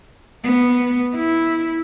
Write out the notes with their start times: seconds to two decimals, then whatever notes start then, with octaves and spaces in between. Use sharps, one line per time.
0.44 B3
1.16 E4